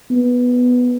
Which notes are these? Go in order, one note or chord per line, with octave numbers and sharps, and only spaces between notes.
B3